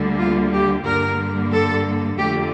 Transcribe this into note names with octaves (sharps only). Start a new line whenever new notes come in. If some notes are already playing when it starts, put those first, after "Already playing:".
Already playing: D2 D3 G3 A#3
F4
G4
G2 D3 G3 A#3 A#4
A4
F2 D3 A3 G4